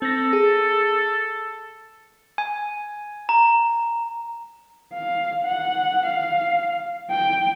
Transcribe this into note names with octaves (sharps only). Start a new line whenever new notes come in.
C4 A4 A#6
G#4
G#5
A#5
F5
F#5
F5
G5